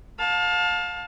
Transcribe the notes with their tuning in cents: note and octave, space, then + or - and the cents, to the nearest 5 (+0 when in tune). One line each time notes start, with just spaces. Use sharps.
F5 +30 A5 +0